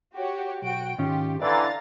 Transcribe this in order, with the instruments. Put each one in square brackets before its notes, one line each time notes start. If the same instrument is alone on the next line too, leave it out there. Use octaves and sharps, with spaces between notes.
[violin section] F#4 G4 C#5
[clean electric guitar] B1 [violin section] F#4 G5 D7
[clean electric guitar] G#2 D#3 C#4 [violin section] F4 G4
[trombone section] D3 E3 [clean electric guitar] D5 [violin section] F5 A#5 A6